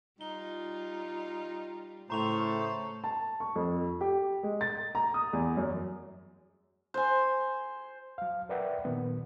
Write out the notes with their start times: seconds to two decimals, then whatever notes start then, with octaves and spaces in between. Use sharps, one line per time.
0.21 G3 D#4 F4 G7
2.10 A2 C#3 A3 A4 C5 A#5 C#6 F7
3.04 A5
3.40 C#6
3.56 F2
4.01 G4
4.43 G#3
4.61 A6
4.95 A#5
5.14 D#6
5.33 E2
5.57 F#2
6.94 C5 G#5
8.18 F#3 F5
8.49 A#4 B4 D5 E5 F#5 G5
8.85 A#2 D#3 F#3 B3